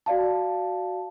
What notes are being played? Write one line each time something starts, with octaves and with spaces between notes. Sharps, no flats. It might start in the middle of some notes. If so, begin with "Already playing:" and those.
F#4 D5 F5 A5